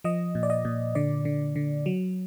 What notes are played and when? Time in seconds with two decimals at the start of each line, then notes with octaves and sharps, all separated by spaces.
0.04 F3 D#5
0.35 A#2
0.43 D5
0.50 D#5
0.65 A#2
0.95 D3 D5
1.25 D3
1.56 D3
1.86 F#3